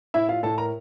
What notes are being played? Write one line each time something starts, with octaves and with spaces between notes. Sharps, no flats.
A2 E4 E5
F4 F5
A2 A4 A5
A#4 A#5